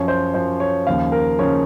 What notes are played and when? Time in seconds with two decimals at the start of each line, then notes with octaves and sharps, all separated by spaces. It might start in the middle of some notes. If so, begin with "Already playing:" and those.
Already playing: F#2 F3 C#5
0.08 C5
0.34 F#2 F3 C5
0.60 C#5
0.87 D#2 C#3 F3 F5
1.12 A#4
1.39 C#3 F3 C#5